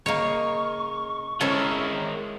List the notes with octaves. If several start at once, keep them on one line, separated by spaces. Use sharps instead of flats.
C#3 A#3 D#4 A#4 C#5 C#6
G#3 C#4 E4 A4 A#4 C5 C#5